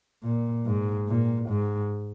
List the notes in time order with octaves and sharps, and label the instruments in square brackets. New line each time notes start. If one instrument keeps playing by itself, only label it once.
[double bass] A#2
G#2
A#2
G#2